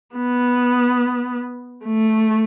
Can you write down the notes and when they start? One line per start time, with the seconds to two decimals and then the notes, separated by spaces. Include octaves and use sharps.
0.16 B3
1.85 A3